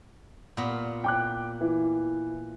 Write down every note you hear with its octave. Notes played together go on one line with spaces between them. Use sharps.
A#2 B3
G5 D6 F#6
E3